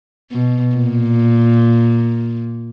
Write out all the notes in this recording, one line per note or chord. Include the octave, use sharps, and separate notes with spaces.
B2
A#2